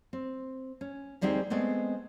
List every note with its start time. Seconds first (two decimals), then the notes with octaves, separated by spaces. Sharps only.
0.13 C4
0.81 C#4
1.21 D2 G3 C4 D#4 G#4 G5
1.50 G#3 A3 B3 C4